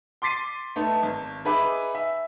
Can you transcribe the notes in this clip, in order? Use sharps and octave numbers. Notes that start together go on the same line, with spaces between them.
C6 D6 A6 B6 C7 D#7
A3 B3 D#4
G#1
D#4 G#4 B4 E5 B5 D6
E5